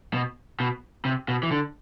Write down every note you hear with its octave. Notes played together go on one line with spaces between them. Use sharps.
B2
B2
C3
B2
E3
D3